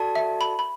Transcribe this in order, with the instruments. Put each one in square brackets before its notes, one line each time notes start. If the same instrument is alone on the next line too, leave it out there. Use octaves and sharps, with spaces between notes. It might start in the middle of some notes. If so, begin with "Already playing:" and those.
Already playing: [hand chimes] F#4 A4 D5 A5
[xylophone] E5
B5
B5